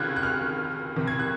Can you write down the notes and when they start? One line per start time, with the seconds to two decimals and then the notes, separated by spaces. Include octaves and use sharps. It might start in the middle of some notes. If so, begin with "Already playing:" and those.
Already playing: C#2 C3 D#3 F6 F#6 G#6
0.16 F#6
0.23 F6
0.96 C2 C3 D#3
1.07 G#6
1.19 F#6